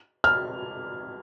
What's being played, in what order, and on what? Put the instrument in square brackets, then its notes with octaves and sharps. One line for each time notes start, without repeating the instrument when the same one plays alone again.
[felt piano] F6